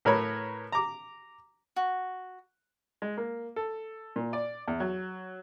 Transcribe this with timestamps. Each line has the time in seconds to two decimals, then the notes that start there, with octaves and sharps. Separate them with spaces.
0.05 A2 A#4 B4 C#5 B5
0.72 A#5 D6
1.76 F#4
3.02 G#3
3.17 A#3
3.56 A4
4.16 A#2
4.33 D5
4.68 E2
4.80 F#3